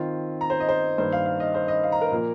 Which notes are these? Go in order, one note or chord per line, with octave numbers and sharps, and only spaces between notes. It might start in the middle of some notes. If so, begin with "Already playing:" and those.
Already playing: D#3 C4 F4
A#5
C5
D#5
C5
G2 D#3 A#3 C5
F5
F5
D#5
C5
D#5
F5
A#5
A#4
A#2 F3 A#3